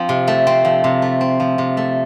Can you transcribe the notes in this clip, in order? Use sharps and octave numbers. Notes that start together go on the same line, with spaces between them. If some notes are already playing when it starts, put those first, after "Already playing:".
Already playing: F3 C4
C3
A3
C4
F3
C3
A3
C4
F3
C3
A3